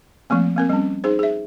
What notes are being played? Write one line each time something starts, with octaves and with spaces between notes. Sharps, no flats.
F3 A3 A#3 C4
A#3 C4 A#4
G3 C4 C#4
D#4 G#4 C5
G#4 E5